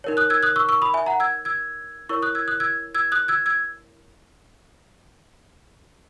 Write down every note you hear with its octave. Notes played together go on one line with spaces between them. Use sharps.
D#4 A#4 C#5
D#6 F#6
E6 G#6
D#6 F#6
C#6 E6
C#6 E6
B5 D#6
E5 G#5
F#5 A#5
E6 G#6
E6 G#6
E4 A#4 C#5 C#6 E6
D#6 F#6
E6 G#6
D#6 F#6
E6 G#6
E6 G#6
D#6 F#6
E6 G#6
E6 G#6